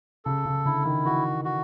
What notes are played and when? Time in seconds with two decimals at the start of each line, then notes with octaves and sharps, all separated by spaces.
0.25 C#3 A4
0.45 C#3
0.65 D3 E4
0.85 D#3
1.05 E3 F#4
1.45 F#4